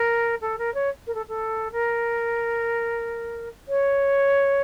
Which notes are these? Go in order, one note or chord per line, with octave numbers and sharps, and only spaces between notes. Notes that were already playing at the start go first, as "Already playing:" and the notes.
Already playing: A#4
A4
A#4
C#5
A#4
A4
A4
A#4
C#5